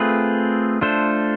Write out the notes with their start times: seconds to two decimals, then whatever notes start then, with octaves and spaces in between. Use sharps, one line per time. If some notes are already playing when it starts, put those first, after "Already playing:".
Already playing: A3 C4 F4 G#4 B4
0.81 A3 D4 F4 A4 C5